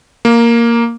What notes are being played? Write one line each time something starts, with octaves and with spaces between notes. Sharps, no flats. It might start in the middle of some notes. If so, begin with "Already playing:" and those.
A#3